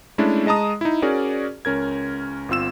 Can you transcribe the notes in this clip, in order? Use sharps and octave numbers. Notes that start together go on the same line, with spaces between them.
G#3 A3 C#4 D4 E4 A4
G#3 D#5 A5 A#5 D#6
D#4 E4
C#4 F#4 G#4 A#4 D5
C#2 C#4 A#4 G#6
G1 C4 F4 E6 E7